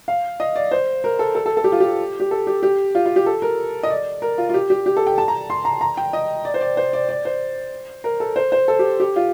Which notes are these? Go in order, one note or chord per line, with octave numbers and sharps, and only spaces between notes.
F5
D#5
D5
C5
A#4
A4
A4
A4
A4
G4
F4
G4
G4
A4
G4
G4
F4
F4
G4
A4
A#4
D#5
D5
A#4
F4
F4
G4
G4
G4
A4
G5
A5
A#5
C6
A#5
A#5
G5
D#5
D5
C5
D5
C5
D5
D5
C5
A#4
A4
C5
C5
A4
G4
G4
F4